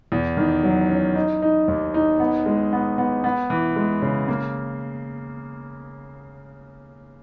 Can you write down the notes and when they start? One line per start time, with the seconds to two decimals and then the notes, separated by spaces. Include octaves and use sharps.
0.12 E2
0.37 D#3
0.64 F#3
0.90 C#4
1.15 D#4
1.42 D#4
1.68 D#2
1.94 D#4
2.20 B3
2.46 G#3
2.73 B3
2.98 B3
3.24 B3
3.50 E3
3.76 G#3
4.02 C#3
4.28 A#3